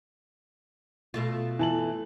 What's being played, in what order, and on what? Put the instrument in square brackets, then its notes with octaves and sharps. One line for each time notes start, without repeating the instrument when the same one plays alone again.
[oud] B2 A3 F4
[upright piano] E3 A5 F#7